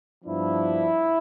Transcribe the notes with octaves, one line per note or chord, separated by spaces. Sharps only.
G2 F3 B3 D4 E4